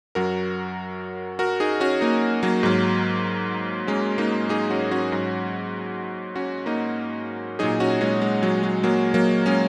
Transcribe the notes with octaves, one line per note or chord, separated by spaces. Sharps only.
F#2 F#3 F#4 A#4
F#4 A#4
D#4 G#4
C#4 F#4
A#3 D#4
F#3 A#3
G#2 F#3
G#3 C#4
A#3 D#4
D#4 G#4
C#4 F#4
C#4 F#4
G#2 F#3
C#4 F#4
A#3 D#4
A#2 F#3 D#4 G#4
C#4 F#4
G#3 C#4
G#3
F#3
F#3
F#3 A#3
F#3 A#3
G#3 C#4